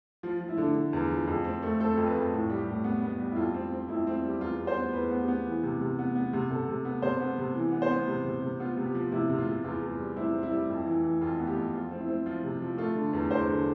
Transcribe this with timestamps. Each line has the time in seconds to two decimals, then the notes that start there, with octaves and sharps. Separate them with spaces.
0.23 F3 F4
0.41 F3
0.48 E4
0.57 D3
0.75 D3
0.93 E2
1.10 F3
1.27 F2
1.44 C4
1.62 A3
1.80 C4 A4
1.97 F2
2.06 B4
2.15 F2
2.32 A2
2.50 G3
2.58 G4
2.67 A2
2.84 B3
3.02 B3
3.20 G3
3.32 E4
3.36 F2 F4
3.54 C4
3.72 C4
3.89 F2 E4
4.07 C4
4.24 G3
4.41 E2 F4
4.59 G3
4.67 C5
4.77 B3
4.93 E2 B4
5.11 B3
5.20 G4
5.28 B3
5.46 E3
5.63 C3
5.81 C3
5.99 B3
6.16 B3
6.33 C3
6.51 C3 A4
6.69 C3
6.85 B3
7.02 C3 C5
7.20 B3
7.38 C3
7.55 E3
7.72 B3
7.82 C5
7.90 B3
8.07 C3
8.25 C3
8.42 C3
8.60 B3 F4
8.77 C3
8.86 G4
8.94 F3
9.12 C3 E4
9.30 C3
9.38 F4
9.47 C3
9.64 E2 F4
9.82 E2
9.99 G3
10.17 C4 E4
10.34 C4
10.43 E4
10.51 G3
10.69 F2
10.86 E3
11.04 E3
11.21 F2 F4
11.39 B3
11.47 G4
11.56 F2
11.74 F3 F4
11.91 C4
12.00 E4
12.08 C4
12.26 F3 F4
12.43 C3
12.61 F3
12.78 A3 F4
12.95 D3
13.13 E2
13.31 E2 C5
13.48 D3